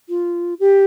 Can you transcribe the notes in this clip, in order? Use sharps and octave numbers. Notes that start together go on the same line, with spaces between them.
F4
G4